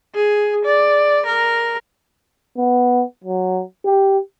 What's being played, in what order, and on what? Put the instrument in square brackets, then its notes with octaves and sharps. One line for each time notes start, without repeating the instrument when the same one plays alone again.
[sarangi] G#4
D5
A#4
[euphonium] B3
F#3
G4